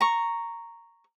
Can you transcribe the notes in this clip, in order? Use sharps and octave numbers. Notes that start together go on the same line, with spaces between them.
A#5 C#6